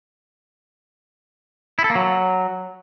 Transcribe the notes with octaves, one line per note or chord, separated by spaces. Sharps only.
E4
A4
A#3
F#3